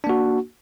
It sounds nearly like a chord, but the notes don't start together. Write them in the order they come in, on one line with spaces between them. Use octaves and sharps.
D4 A#3 F#4